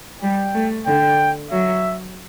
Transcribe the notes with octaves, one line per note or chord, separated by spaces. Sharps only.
G3 G5
A3
D3 G5
F#3 E5